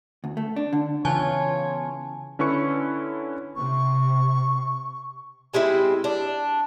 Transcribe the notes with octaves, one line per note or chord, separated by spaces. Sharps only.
D2
A3
D4
D3
C#3 E3 B3 F4 C#5 G#5 A5
D3 C#4 E4 B4 C#6 C#7
C3 C#6
G3 G#3 C4 E4
D4